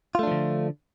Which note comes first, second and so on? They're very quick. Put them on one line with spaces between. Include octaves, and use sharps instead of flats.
F4 A3 D4 F3 D3